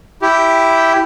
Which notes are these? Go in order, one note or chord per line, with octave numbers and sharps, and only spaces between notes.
E4 G4